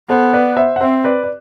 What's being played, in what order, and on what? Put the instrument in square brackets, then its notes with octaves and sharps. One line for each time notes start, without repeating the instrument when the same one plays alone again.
[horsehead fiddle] B3 [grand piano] A4 C5
[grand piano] B4 D5
C5 E5
F#5
[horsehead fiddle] C4 [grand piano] C5 E5
[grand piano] B4 D5
D5